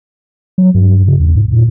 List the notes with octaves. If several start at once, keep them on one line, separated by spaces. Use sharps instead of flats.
F#3
G2
C#3
E2
G#2
A#2